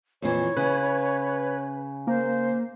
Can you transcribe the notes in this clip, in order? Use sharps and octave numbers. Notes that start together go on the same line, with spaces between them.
F2 A#2 E3 C#5
C#3 B4
A#3 C5